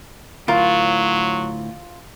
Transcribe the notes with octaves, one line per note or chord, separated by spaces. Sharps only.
D2 A2 F#3 F4 A#4